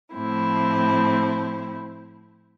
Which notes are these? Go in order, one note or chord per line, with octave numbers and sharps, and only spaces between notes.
A2 F3 C4 E4